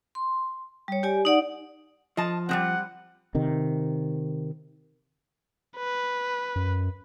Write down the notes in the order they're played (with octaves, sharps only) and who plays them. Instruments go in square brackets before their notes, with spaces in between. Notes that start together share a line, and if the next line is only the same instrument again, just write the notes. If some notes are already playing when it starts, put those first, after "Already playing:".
[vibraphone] C6
G3 C#5
G4 D5 G#5
D#4 D5 F#5
[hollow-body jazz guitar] F3 [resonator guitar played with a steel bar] D#5 A5
[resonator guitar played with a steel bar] G3 G#3 C4 [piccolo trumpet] F#5
[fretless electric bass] C3 D#3
[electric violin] B4
[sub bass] F#2